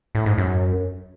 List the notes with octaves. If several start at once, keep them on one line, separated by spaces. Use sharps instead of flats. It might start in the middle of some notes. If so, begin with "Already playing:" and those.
A2
G#2
F#2